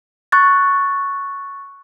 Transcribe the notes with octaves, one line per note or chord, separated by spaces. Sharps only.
C#6 F#6 A6